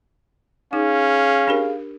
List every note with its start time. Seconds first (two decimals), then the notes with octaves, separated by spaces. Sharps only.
0.73 C#4 D#4 G#4 F5
1.48 D4 G4 A#4